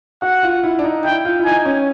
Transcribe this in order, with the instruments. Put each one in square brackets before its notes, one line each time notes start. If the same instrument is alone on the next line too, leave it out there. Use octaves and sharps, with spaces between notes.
[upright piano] F#4 [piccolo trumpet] F#5
[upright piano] F4
E4
D4
D#4
[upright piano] E4 [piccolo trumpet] G5
[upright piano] F4
E4
[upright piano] D#4 [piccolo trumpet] G#5
[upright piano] C#4